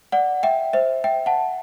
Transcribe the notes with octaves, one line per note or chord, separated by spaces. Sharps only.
D5 F#5
E5 G5
C5 E5
E5 G5
F#5 A5